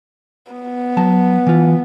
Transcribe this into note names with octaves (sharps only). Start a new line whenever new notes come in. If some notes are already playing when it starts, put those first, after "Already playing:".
B3
F#3 A5
E3 F4